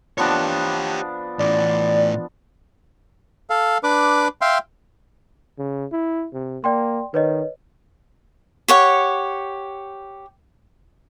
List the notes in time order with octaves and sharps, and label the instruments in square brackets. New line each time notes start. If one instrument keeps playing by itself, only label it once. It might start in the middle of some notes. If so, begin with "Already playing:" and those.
[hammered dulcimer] F3 B3 D4 [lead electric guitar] G4 C#5
[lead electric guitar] A2 E3 [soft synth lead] D5
[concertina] A4 F5
D4 B4 D6
E5 F5 G5 C6
[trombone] C#3
E4
C3
[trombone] A#3 [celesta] D5 G5 C6
[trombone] D#3 [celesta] B4 C#5 D#5
[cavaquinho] G4 C#5 F#5